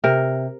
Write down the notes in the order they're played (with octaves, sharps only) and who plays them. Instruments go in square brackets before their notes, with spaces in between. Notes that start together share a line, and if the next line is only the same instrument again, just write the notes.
[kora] C3 A#4